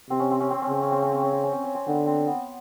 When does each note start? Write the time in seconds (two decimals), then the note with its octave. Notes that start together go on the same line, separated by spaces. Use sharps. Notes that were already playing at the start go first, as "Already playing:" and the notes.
0.10 C3 C4
0.19 C#4
0.31 C4
0.40 C#4
0.51 C4
0.62 C#4
0.69 C#3 C4
0.82 C#4
0.92 C4
1.02 C#4
1.12 C4
1.23 C#4
1.33 C4
1.44 C#4
1.53 C4
1.64 C#4
1.75 C4
1.87 D3 B3
2.07 C4
2.27 B3